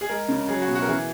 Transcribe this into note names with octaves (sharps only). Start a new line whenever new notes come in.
G#4
G#3 A#4
C#3
F#3 G#4
F#4
B2
F#4
A#4
E3 G#4